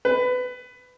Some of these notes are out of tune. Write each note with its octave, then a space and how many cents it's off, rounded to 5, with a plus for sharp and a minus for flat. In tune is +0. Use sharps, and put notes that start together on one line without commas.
B4 +20